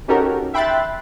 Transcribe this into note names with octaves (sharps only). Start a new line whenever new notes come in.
C#4 D#4 F#4 G4 A4 A#4
E5 G5 B5 C6 F#6 A6